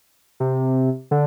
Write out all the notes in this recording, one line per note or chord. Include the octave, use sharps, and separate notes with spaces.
C3
D3